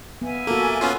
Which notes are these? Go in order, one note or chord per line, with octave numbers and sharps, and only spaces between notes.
B3 E5 F5 G#5
A#3 F#4 A4
B3 C#4 F4